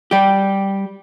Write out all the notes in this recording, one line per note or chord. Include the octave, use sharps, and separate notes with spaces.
G3 G4